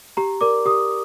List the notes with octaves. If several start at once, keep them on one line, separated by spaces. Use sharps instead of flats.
G4 A#5
A#4 D5 D6
G4 D#6